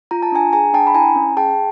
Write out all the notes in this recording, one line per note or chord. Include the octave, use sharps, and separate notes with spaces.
F4 A#5
A5
D4 G#5 A#5
G#4 G#5 A#5
D4 G5 A5
B5
E4 G#5 A#5
C#4
G#4 G5 A5